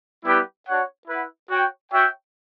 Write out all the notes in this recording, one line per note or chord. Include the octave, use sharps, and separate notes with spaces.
G3 B3 E4 G4 B4
D4 F#4 C#5 F#5
E4 B4 F#5
F#4 C#5 G5
F#4 C#5 E5 G5